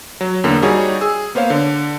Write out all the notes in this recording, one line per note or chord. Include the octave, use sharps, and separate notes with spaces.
F#3
E2 D3 A#3
G3 D#4 F#4 G#4 C#5
G#4 E6
A#3 B3 C5 C#5 F5
D3